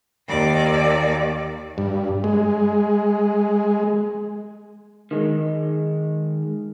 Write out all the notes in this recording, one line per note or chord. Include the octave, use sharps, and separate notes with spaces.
D#2 D5
G2
G#3
D#3 G#3